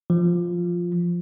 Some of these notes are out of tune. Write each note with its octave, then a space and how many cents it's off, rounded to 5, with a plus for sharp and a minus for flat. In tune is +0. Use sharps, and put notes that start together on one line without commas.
F3 +0